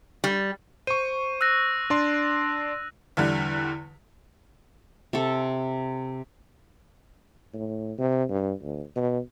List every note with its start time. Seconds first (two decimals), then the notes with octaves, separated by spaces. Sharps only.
0.24 G3
0.87 C5 C#6 D#7
1.41 E6 F#6 A#6
1.90 D4 D5 C6
3.17 E2 D3 G3
5.13 C3 A4
7.54 A2
7.98 C3
8.30 G2
8.63 D2
8.96 B2